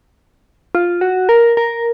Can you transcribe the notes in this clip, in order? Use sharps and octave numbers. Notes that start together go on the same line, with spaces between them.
F4
F#4
A#4
A#4